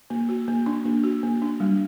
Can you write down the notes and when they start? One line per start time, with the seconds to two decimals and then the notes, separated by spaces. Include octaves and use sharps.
0.10 A#3
0.29 F#4
0.48 A#3
0.66 D4
0.85 A#3
1.04 F#4
1.23 A#3
1.42 D4
1.60 G3